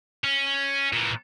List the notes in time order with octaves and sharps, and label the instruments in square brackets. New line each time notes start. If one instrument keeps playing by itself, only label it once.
[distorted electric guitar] C#4
A#2 E3